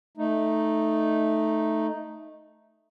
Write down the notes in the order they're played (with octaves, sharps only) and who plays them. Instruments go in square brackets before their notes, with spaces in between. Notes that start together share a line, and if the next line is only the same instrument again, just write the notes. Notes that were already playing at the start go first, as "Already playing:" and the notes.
[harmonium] A3 D#4